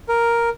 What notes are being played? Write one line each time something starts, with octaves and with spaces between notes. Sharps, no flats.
A#4